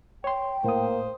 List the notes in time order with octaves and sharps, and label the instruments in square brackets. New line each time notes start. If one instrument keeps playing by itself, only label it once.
[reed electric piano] C#5 C6 [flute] G5
[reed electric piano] A2 D#6 [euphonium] A#3 [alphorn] C5